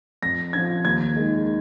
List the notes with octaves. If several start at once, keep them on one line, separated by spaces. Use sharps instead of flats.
F2 A#6
F3 C#4 G#6
D#2 G#6
D#3 G#3